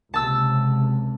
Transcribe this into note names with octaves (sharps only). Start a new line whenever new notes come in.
C#2 C3 A5 E6